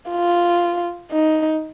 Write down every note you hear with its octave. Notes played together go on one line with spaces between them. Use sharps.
F4
D#4